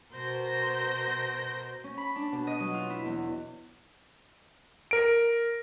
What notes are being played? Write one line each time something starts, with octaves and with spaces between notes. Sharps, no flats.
B2 A#4 C5 G6 A#6
C#4
B5
D4
B2
D#5
F#3
F4
E4
E2
A#4 D7